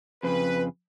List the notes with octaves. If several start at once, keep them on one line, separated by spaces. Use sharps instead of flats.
F2 C#3 B4